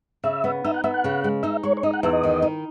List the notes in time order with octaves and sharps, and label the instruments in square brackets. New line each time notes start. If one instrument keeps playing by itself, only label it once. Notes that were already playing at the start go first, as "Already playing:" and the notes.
[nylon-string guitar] C#3 [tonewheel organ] E5
[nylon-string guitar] B3
[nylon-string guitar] D#4 [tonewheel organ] E5
[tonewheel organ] F#5
[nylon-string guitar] B3 [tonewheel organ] E5
[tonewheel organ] F#5
[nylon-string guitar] C#3
G#3
[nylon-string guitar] D#4 [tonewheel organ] E5
[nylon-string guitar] G#3 [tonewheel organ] C#5
[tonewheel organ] C#5
[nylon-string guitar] D#4 [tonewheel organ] D#5
[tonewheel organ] F#5
[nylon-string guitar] E2 [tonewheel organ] E5
[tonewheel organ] D#5
[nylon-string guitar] D#3
D#4